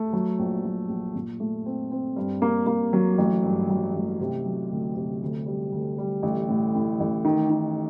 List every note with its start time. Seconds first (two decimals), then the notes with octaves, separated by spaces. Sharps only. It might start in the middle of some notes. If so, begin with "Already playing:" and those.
Already playing: A3
0.13 F#3
0.39 A#1
0.64 F#3
0.89 A#1
1.15 A#2
1.40 A3
1.66 C4
1.92 C4
2.16 G2
2.42 A#3
2.67 A#3
2.93 F#3
3.18 A1
3.43 G2
3.70 F#3
3.95 A1
4.20 C3
4.45 F#3
4.71 D2
4.96 C3
5.22 D2
5.46 G3
5.72 D2
5.98 G3
6.23 A1
6.49 A2
6.75 A2
7.00 A1
7.25 D#3
7.50 D#3